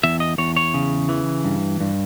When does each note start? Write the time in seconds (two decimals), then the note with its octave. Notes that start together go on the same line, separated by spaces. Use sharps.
0.03 E2 E5
0.20 D#5
0.38 E2 C#5
0.56 C#5
0.74 C#3
1.09 E3
1.45 G2
1.81 G2